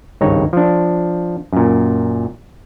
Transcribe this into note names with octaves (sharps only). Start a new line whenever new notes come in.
G#1 C#2 G2 D#4 C#5
F3 D4
F#2 A#2